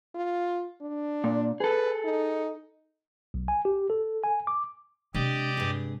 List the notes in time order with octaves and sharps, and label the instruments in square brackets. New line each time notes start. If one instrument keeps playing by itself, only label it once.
[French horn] F4
D4
[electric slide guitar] A#2
[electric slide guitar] G#4 A4 [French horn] B4
[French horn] D#4
[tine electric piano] B1
G#5
G4
A4
G#5
D6
[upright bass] C3 G#3 [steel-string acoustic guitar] D4 [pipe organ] G4 D5 D#5
[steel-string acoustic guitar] G2 G#4